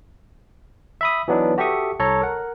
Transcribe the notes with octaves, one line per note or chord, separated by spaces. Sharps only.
E5 B5 D#6
E3 F#3 B3 D4 D#4
F#4 G4 A4 E5 C#6 D#6
C2 A4 C#5 A#5
A#4 F#5